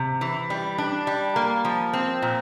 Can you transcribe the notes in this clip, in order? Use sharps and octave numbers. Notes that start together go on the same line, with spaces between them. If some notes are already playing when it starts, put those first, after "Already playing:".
Already playing: C3
E3
G3
D4
G3
A#3
F3
C4
A#2